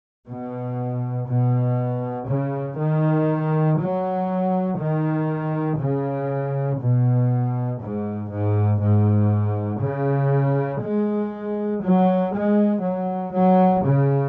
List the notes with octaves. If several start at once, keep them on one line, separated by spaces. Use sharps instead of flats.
B2
B2
C#3
D#3
F#3
D#3
C#3
B2
G#2
G#2
G#2
C#3
G#3
F#3
G#3
F#3
F#3
C#3